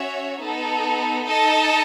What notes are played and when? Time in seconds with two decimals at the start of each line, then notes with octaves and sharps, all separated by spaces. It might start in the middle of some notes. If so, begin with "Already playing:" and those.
Already playing: C#4 F#4 C#5 E5
0.39 B3 D#4 A4
1.27 D#4 A4 D#5 A5